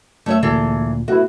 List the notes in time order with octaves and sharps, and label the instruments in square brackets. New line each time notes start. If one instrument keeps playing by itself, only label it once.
[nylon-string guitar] A3 C#5 E5
[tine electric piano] D2 A#2 [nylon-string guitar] E3 G#4 A4
[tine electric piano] A3 B3 E4 [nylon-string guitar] F#4